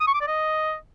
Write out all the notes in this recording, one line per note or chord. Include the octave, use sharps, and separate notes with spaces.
D#6
C#6
D6
D5
D#5